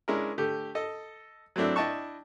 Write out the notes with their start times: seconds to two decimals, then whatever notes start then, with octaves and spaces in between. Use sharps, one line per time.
0.08 G#3 C#4 D4 E4 A#4
0.38 D3 A3 G4
0.75 A4 D#5
1.56 F#3 A3 C4 D4 E4
1.76 D4 E4 D#5 G5 A5 C#6